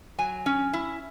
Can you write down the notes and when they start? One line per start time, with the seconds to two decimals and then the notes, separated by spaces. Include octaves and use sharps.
0.18 F#3 G#5
0.46 C#4
0.73 E4